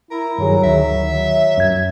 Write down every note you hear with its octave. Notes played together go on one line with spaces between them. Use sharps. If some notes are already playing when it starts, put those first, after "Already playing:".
E4 A#4
G2 D#3 F#3 G#4
D2 D#3 E5
F#3
F#2 G#6